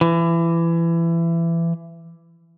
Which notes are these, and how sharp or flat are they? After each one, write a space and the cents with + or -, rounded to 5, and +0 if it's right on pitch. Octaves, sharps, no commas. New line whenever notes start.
E3 +25